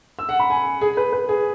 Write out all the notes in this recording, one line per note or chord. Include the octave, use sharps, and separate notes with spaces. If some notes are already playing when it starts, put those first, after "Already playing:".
E6
F#5
B5
G#5
G#4
B4
B4
G#4